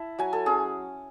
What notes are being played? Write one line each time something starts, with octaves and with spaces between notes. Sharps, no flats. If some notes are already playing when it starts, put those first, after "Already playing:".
Already playing: E4 A5
F#3 G#5
A4
C#4 G#4